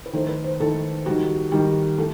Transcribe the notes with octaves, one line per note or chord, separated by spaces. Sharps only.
B4
D#3 A3 C5
B4
C5
D#3 A3 A4
D#3 G3 F#4
D#3 G3
A3